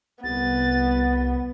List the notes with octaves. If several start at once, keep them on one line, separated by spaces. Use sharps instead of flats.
C2 B3 A6